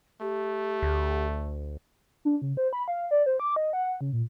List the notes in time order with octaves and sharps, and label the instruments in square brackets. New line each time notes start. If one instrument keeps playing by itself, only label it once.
[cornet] A3 [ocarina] G4
[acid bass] D2
[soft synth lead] D4
C#3
C5
B5
F5
D5
C5
D6
D#5
F#5
C#3
A#2